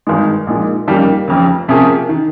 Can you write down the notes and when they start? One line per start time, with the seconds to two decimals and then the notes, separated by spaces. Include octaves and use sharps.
0.07 G#1 G2 D#3 G#3
0.47 A#1 A#2 G#3 D#4
0.87 F2 C#3 G3 A#3 D#4
1.28 F1 F2 C#3
1.68 C3 F3 A#3 C#4 G#4
2.09 D#3